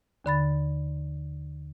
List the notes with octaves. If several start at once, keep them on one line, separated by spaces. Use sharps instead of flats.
D#2 D3 B5 A6